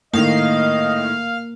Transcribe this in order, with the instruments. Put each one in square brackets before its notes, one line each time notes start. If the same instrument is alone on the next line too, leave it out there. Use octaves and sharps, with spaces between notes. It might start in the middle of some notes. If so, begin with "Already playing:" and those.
[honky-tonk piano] A2 D#3 [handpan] A#3 [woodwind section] D#5 [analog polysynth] F5